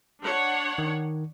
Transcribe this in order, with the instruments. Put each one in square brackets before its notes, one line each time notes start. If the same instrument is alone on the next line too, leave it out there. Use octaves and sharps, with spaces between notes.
[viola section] D4 C#5 F#5
[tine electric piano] D#3